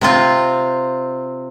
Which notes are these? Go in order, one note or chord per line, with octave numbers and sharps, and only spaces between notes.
C3 C4 F4